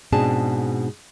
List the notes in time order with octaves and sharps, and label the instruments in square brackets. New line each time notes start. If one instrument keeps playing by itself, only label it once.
[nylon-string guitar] G#2 B2 C4 D4 G#4 A5